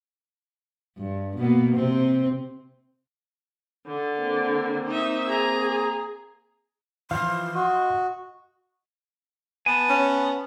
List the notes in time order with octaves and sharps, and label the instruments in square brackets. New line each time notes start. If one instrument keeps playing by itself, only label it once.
[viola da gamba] G2
B2 A#3 B3
C3 C4
[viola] D3
[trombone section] A#3 C4
[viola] D#4 E5
[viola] G#4 [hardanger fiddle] A#5
[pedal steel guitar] E3 F3 [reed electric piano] F5 F6 [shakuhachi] C6
[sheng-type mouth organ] F#4 [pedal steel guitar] D#5
[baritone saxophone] B3 [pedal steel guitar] G#5 A5
[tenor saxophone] C#4